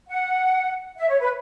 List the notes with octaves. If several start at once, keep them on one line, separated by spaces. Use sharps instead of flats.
F#5
E5
C#5
B4